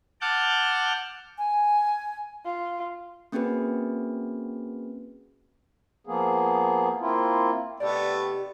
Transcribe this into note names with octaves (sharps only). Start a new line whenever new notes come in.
F#5 A5 D6 F6 G6
G#5
F4
A#3 C4 C#4 F#4 G#4 B4
F3 A#3 B3 G#4
A#3 C4 E4 F4
C3 D#3 A3 B3 G4 D5